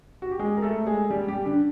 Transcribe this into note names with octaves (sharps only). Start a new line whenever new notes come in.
F#4
G4
G#3 G#4
A#4
A3 A4
G#3 G#4
G3 G4
G3 G4
D3 D4